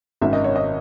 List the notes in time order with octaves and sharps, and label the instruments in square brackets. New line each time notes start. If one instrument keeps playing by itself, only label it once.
[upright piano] G#1 F#2 D#3 E5
D#5
C#5
D#5